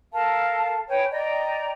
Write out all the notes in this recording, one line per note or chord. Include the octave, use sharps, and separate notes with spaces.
A4 A#4 F5 A5
B4 C#5 G5 G#5
D5 D#5 G5 A#5